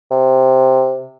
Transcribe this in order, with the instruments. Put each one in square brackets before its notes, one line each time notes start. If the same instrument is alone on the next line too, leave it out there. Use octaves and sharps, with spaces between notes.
[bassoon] C3